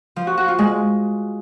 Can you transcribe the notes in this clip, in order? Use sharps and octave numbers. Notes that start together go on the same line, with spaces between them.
F3
F#4
F#4
F4
G#3